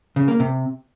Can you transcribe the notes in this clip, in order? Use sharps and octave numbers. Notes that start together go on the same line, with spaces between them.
C#3
A#3
C3